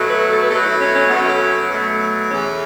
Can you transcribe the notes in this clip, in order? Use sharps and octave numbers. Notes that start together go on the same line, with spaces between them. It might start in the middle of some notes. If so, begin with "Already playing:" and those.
Already playing: B2 F#3 A3
B4
A4
B4
B2 F#3 A3 A4
E4
C#4
C#4
B2 F#3 A3 B3
C#4
B2 F#3 A3
E2 E3 A3 C#4